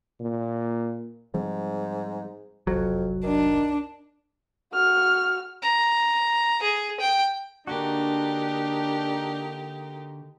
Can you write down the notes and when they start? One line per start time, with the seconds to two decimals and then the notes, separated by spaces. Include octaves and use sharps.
0.20 A#2
1.34 G#2 F3 G3 C4
2.67 F#1 C2 F2 F#3
3.23 D#3 D4
4.73 F#4 F6
5.62 A#5
6.63 G#4
7.00 G5
7.67 D3 A#3 D4 D#4 F#4 G4 A#4